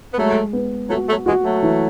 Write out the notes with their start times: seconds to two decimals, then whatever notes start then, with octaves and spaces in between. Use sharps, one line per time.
0.13 B3
0.17 F#3 G#3 A3
0.53 B3
0.90 F#3 A3 F#4
1.08 F#3 A3
1.26 E3 G#3 F#4
1.44 F#3 A3
1.62 E3